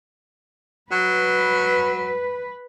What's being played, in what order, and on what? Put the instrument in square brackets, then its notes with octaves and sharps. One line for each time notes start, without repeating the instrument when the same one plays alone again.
[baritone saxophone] F#3 [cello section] B4